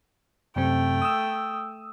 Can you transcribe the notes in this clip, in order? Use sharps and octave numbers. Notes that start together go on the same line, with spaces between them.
F#2 C3 A3 C4 G5
D#6 E6